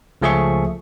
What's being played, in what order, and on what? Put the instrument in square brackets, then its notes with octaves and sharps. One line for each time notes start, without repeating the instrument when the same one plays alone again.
[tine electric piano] C#2 F3 A3 G#4 E5 C#6